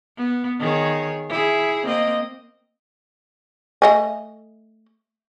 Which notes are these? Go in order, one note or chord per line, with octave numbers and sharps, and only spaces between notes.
B3
D#3 G#4 C#5
E4 G#4
A#3 C4 D#5
A3 D#5 G#5